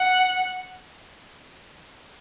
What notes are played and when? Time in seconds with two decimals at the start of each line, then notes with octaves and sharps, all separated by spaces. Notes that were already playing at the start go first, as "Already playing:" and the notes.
Already playing: F#5